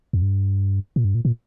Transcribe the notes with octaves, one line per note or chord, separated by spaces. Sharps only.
F2
G2
A#2
G2
A#2
A#2